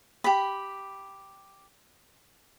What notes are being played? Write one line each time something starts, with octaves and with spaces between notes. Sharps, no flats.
G4 B5